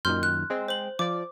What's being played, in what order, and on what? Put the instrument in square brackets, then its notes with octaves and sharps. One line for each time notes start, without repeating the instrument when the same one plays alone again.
[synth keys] F#2 A#2 D#3 [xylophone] C6 F6 G6
[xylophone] F#6
[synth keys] G#3 C4
[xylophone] C5 F#7
[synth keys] F3 D5 [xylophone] D6